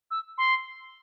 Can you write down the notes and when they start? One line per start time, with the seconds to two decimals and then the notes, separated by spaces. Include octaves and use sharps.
0.11 E6
0.38 C6